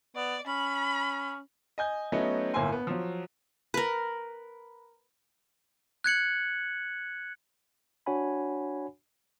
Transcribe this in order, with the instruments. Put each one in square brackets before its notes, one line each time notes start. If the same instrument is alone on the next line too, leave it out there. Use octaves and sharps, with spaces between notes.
[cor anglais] B3 [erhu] D5
[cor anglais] C#4 [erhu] B5
[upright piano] D#5 G#5 G6
F#3 A3 B3 C#4 D#4
G1 A2 A#3 E4 G#5 C6
B3
F3 F#3
[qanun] A#4 B4
[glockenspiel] F#6 G#6 C#7 F#7
[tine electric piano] D4 F#4 C#5 F#5 G#5 B5